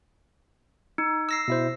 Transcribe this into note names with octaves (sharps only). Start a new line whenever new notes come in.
D#4
E6 A#6 C7
B2 E4 C5